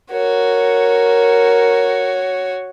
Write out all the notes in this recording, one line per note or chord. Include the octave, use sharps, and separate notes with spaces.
F#4 A#4 C#5